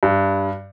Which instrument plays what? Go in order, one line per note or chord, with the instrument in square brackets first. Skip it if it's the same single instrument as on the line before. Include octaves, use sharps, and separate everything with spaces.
[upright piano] G2